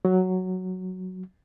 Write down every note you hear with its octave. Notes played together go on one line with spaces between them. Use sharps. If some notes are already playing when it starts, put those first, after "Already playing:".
F#3